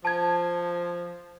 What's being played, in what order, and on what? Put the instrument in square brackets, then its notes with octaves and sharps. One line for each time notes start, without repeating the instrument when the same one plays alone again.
[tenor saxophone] F3 [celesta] A5 G#6